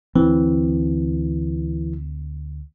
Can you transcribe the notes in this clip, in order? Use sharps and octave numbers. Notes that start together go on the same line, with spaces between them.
D2 E3 C4